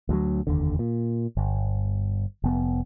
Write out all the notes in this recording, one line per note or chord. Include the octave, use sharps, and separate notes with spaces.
D2 F3 F#3
F1 D#2 D3
A#2
G1
F1 B3